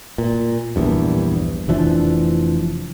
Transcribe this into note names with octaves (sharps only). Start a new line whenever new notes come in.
A#2
A#1 E2 G2
F1 E3 F3 D4